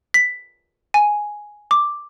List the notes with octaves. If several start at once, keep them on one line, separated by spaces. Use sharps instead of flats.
B6
G#5
D6